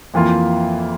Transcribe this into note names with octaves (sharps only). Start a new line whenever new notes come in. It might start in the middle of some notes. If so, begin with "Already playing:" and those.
F2 E3 A#3 F4